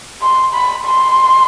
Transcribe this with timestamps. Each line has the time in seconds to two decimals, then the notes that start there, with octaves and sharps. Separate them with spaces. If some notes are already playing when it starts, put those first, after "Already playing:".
0.22 C6
0.54 B5
0.86 C6